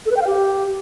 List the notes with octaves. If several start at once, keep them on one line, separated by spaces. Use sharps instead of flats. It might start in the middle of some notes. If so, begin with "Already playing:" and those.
A4
B4
G5
F5
G4